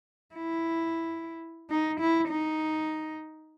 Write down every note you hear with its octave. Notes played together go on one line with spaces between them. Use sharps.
E4
D#4
E4
D#4